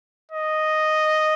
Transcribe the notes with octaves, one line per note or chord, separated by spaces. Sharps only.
D#5